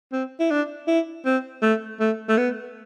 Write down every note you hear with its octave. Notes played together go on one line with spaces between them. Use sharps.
C4
E4
D4
E4
C4
A3
A3
A3
B3